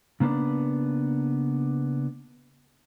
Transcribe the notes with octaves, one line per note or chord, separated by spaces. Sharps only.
C#3 A#3 B3 D4 B4